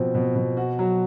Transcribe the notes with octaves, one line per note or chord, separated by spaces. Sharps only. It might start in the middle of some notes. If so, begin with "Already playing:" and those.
Already playing: B2 F3 C4
B2
B2
F#4
F#3